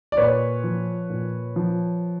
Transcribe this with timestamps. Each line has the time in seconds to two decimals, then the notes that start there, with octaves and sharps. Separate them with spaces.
0.12 D5
0.17 A#2 B4 C#5
0.64 F3
1.10 A#2
1.56 F3